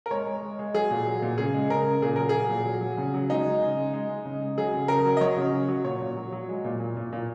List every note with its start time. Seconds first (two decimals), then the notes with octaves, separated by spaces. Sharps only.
0.06 A#4
0.10 G#3 C#5
0.26 G#3
0.42 G#3
0.59 G#3
0.74 F#3 G#4
0.90 A#2
1.06 F#3
1.22 A#2
1.38 C#3 G#4
1.54 G#3
1.70 C#3 A#4
1.86 C#3
2.02 A#2 G#4
2.16 F#3 A#4
2.29 F#3 G#4
2.50 A#2
2.65 F#3
2.81 F#3
2.97 C#3
3.14 F#3
3.30 G#3 D#4
3.45 G#3
3.61 C#3
3.77 G#3
3.93 G#3
4.09 G#3
4.25 C#3
4.41 G#3
4.58 F#3 G#4
4.73 C#3
4.88 C#3 A#4
5.05 F#3
5.17 D#5
5.21 F#3 C#5
5.37 C#3
5.53 F#3
5.68 F#3
5.84 A#2 C#5
6.01 A#2
6.17 F#3
6.32 F#3
6.49 G#3
6.64 A#2
6.80 A#2
6.97 A#2
7.13 A#2